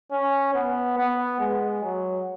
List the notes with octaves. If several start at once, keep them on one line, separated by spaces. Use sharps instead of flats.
C#4
B3
B3
G#3
F#3